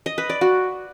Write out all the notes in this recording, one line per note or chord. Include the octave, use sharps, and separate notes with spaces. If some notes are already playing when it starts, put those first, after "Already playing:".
D#5
B4
D5
F#4